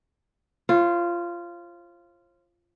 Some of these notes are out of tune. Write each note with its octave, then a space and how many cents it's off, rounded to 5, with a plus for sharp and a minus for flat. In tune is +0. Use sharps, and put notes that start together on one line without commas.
F4 -15 C5 +45